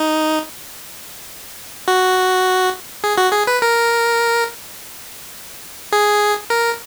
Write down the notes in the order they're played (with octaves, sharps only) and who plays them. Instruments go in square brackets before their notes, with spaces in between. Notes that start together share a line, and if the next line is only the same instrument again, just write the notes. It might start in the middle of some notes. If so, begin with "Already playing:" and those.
Already playing: [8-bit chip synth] D#4
F#4
G#4
F#4
G#4
B4
A#4
G#4
A#4